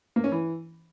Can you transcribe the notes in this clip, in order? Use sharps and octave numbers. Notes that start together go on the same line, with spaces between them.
A#3
C#4
E3